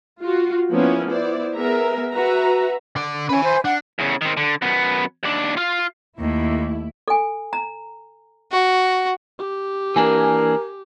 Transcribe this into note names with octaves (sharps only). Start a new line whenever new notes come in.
F4 F#4
F3 A#3 B3 C#4 E4
B3 E4 C5 D5
B3 G#4 A#4 E5 A#5
F#4 B4 E5 A#5
D3 D5
C#4 B4 G#5
C5
D4 F#5
E2 C#3
D#3 C4
D3
F#2 B3
D#2 D4
F4 F5
D#2 A3 E4
A4 G#5
A#5
F#4
G4
E3 A#3 D4 A#4 G#5